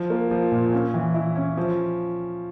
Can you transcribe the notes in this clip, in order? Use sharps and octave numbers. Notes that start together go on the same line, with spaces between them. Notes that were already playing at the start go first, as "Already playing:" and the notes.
Already playing: F3
A#3
F3
A#2
C#4
E3
E4
C#4
F3